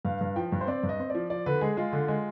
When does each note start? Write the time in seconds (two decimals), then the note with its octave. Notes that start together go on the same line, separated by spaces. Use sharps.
0.05 G2 F5
0.21 G2
0.36 F3 G5
0.52 G2
0.61 C5
0.67 C4 D5
0.83 G2
0.89 D#5
1.00 C4
1.10 F3 D5
1.30 F3 D5
1.46 D3 B4
1.61 G#3 G#4
1.77 G#3 F4
1.93 D3
2.08 G#3